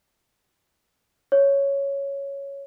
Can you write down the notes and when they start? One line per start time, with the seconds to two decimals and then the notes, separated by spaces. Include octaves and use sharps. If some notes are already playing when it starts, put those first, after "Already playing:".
1.32 C#5